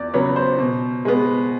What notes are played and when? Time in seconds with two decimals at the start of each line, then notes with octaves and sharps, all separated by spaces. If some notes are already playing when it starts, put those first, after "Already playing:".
Already playing: E2 D5
0.14 C#3 F#3 B3 C#5
0.36 C5
0.58 B2
1.05 G#3 B3